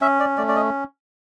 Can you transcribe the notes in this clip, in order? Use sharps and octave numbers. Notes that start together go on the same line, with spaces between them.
C#4 E5
D5
A3 D5
D5
D#5